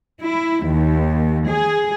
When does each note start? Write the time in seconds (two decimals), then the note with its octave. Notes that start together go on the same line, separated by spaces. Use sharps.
0.21 E4
0.66 D#2
1.50 G#4